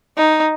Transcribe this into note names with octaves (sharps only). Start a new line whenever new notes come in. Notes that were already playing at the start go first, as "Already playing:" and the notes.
D#4